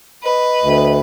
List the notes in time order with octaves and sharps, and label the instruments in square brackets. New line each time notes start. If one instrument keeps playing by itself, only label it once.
[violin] B4 [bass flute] D#5
[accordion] D2